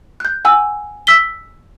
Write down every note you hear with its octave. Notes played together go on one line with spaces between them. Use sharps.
F#6 G6
F#5 G#5 E6
E6 B6 G7